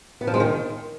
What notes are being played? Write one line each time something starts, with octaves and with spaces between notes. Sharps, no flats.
B3
F3
G#3
D#3